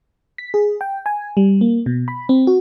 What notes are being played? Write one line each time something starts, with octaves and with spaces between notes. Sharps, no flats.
B6
G#4
G5
G#5
G3
A#3
B2
B5
C4
F#4